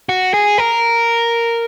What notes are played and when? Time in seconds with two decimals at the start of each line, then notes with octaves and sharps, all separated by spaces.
0.09 F#4
0.34 G#4
0.58 A#4